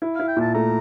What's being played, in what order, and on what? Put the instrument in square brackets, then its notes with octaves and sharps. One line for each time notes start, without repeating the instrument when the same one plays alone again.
[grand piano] E4
[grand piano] E4 [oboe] F5
[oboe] G5
[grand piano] A#2 [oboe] A5
[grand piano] A3 [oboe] A#5